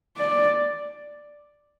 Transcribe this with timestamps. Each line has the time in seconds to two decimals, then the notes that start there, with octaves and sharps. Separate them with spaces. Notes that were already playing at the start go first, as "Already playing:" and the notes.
0.17 D5